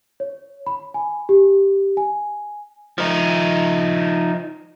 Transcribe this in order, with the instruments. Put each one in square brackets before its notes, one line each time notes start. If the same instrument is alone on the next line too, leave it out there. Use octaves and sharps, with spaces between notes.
[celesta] C#5
B5
G#5
G4
G#5
[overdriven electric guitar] F3 D#4